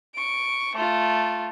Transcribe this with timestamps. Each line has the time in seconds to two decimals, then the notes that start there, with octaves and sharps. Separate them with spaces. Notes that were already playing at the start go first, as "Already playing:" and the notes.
0.15 C#6 D7
0.76 A3 F4